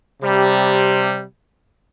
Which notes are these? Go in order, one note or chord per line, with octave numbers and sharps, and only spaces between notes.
C3 G3